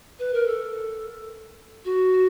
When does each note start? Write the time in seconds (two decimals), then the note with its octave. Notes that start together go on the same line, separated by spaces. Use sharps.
0.19 B4
0.33 A#4
0.47 A4
1.85 F#4